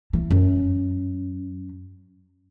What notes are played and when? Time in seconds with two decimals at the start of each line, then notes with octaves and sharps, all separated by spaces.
0.13 E3
0.30 F#2